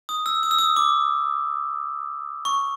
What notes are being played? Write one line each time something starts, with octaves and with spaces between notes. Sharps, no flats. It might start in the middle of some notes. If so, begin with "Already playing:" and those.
D#6
E6
D#6
E6
D#6
D6
C#6